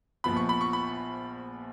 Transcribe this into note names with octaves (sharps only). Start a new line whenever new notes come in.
A#1 A#2 F3 B3 B5
C#6
B5
C#6
B5